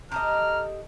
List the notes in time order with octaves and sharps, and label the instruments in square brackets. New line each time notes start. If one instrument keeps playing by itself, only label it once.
[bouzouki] G4 A4 D#5 [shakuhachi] A#5 [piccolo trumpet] F6